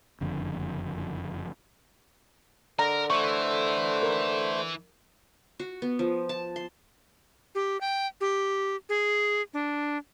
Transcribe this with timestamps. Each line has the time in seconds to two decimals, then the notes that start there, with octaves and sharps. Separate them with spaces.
0.21 F#1 F2 D3
2.79 D3 A#4 A#5
3.10 E3 A3 C5 C#6
4.03 A#4
5.60 F#4
5.82 B3
5.99 F3
6.29 A5
6.56 C6
7.55 G4
7.81 G5
8.21 G4
8.89 G#4
9.54 D4